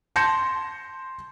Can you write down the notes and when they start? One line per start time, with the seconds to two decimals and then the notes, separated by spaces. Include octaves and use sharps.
0.16 A5 C6 G6 A#6 C#7 E7